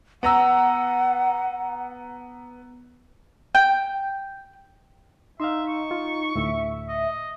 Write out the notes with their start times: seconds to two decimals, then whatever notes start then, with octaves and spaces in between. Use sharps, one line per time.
0.23 B3 F#5 A#5 E6
3.55 G5
5.40 D#4 E5 F5 C6
5.68 C#6
5.91 F4
6.36 D2 A2 E5
6.88 D#5